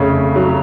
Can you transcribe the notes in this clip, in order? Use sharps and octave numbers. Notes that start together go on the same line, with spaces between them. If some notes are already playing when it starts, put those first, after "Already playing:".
Already playing: F2 C#3 A3
F#3